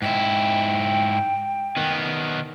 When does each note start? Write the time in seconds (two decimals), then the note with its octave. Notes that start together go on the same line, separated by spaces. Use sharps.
0.02 G#2 E4 G5
1.77 D#3 B3